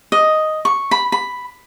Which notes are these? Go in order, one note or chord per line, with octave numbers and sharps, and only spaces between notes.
D#5
C#6
B5
B5